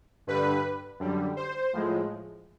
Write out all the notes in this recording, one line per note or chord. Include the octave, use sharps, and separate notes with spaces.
G2 D3 G3 B4
F#2 D3 G3
C5
A2 F3 G#3